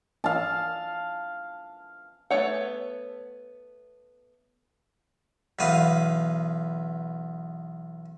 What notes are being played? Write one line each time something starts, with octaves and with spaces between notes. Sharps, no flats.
F5 A5
A3 B3 D4 C#5 F#5
B1 E2 B4 F5 D#6